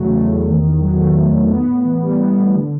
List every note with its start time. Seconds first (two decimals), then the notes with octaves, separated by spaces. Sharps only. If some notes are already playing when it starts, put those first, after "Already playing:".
Already playing: E2 C#3 F#3 A3
0.11 A3
0.28 E2
0.46 D#3
0.63 D#3
0.81 F#3
0.97 A3
1.15 D#3
1.33 D#3
1.50 B3
1.67 A2
1.84 E3
2.03 G3
2.19 B3
2.37 A2
2.54 D3